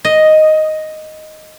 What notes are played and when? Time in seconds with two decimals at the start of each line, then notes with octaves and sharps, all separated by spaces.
0.05 D#5